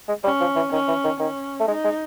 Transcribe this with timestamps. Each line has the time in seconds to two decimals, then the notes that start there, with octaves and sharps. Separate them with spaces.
0.08 G#3
0.24 G3 C#4
0.40 F3
0.56 E3
0.72 D#3 C#4
0.88 E3
1.04 D#3
1.20 D#3 C#4
1.60 A3
1.68 G#3 D#4
1.84 G#3